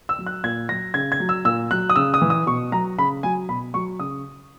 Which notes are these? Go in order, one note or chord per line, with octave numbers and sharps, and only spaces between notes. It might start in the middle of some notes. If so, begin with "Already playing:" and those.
E6
F#3
F#6
A#2 G#6
F#3 A#6
C#3 G#6
G#6
F#3
E6
A#2 E6
F#3 F#6
D#6
C#3 E6
D#6
E3
D#6
B2 C#6
F#3 A#5
C#3 B5
F#3 G#5
B2 B5
F#3 C#6
C#3 D#6